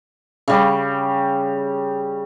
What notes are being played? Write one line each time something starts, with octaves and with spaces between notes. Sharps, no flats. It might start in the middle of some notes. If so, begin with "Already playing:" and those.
C#3 G3